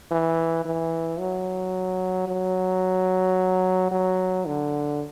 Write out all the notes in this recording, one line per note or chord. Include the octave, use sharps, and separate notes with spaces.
E3
E3
F#3
F#3
F#3
D3